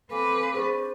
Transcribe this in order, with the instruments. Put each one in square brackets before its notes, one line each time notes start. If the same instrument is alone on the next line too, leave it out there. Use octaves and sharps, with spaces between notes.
[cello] C4 B4 [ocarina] A4 [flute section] F5 G#5 D6
[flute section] D4 C#6 [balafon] G#4 [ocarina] C5